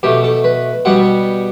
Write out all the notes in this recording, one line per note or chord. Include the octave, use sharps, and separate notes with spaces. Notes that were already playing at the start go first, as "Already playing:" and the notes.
B2 A3 G4
A4
B4
B2 G3 B3 F#5